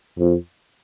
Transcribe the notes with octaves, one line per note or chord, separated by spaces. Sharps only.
F2